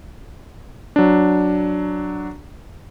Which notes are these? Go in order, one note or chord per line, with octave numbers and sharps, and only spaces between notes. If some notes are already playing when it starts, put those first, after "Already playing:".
F#3 D4